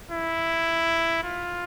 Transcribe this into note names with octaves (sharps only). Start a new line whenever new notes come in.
E4
F4